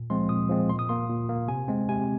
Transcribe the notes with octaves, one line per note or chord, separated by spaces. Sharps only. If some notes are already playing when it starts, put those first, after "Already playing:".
Already playing: A#2
F3 G#3 C4 C6
A#2 D#6
F3 G#3 C4
A#2 C6
D#6
A#3 C6
A#2
A#3
C3 G#5
G#3 C4
C3 G#5